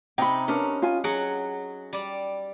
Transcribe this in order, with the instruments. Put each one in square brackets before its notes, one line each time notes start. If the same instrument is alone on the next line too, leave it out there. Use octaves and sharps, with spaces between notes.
[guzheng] C3 D#4 [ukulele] G5 B5
[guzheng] C#4 [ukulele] D4 A#4 B4
[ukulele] F4 G#5
[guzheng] F#3 F#5 [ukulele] G#4
[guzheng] G3 D5